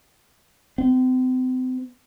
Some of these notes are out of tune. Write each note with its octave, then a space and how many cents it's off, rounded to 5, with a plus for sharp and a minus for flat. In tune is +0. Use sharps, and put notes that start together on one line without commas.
C4 -40